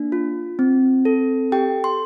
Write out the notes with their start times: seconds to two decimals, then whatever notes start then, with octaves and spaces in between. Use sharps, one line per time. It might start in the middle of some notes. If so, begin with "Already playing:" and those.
Already playing: A#3 D4
0.12 F4
0.59 C4
1.05 A4
1.52 G4 G5
1.84 C6